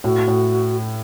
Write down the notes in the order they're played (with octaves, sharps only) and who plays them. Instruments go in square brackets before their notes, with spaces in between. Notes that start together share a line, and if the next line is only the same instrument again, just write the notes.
[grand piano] A2 [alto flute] F#4
[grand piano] A2